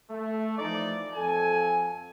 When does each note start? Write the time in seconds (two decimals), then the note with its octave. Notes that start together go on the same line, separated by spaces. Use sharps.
0.11 A3
0.58 E3 F3 D#4 D5
1.15 F2 A4 G#5